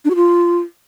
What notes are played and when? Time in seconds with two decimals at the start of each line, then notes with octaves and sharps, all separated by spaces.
0.05 D4
0.10 F#4
0.16 F4